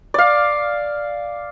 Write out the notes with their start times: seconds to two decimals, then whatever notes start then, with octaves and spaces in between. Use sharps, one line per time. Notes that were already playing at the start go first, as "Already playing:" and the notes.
0.14 D5 F5